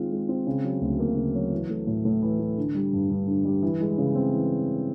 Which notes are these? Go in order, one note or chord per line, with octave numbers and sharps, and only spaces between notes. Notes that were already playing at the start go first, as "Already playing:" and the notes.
Already playing: D#3 G#3 C4 F4
G#3
C4
C#3
F#3
D2
A#3
C#3
F#3
E3
A3
A2
A2
E3
A3
D3
G3
G2
G2
D3
G3
E3
G#3
C#3
C4
E3